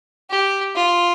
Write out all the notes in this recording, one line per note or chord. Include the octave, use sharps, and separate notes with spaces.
G4
F4